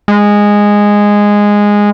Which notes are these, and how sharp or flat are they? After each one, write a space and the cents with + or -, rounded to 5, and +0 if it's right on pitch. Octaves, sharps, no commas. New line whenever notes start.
G#3 -10